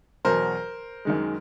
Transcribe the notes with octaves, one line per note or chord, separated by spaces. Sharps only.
E2 B2 F#3 A#4 C5
F#2 D#3 G#3